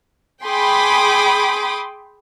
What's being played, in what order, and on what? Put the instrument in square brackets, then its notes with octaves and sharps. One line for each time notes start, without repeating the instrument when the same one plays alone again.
[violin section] G#4 G5 B5 C6 D6 D#6